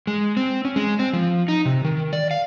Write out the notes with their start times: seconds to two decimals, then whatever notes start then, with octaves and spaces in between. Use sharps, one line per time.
0.07 G#3
0.37 C4
0.65 C#4
0.76 G#3
0.99 C4
1.13 F3
1.48 D#4
1.66 C3
1.84 D#3
2.13 D5
2.31 F5